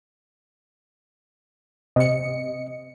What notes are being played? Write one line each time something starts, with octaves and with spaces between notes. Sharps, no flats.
C3 D#5 C#7